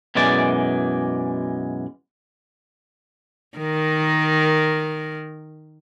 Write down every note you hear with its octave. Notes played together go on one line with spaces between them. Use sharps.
F#2 B2 E3 G#3 D5
D#3 A#4